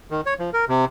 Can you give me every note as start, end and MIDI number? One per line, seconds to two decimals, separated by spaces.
0.10 0.21 51
0.26 0.34 73
0.39 0.50 53
0.53 0.65 70
0.68 0.85 48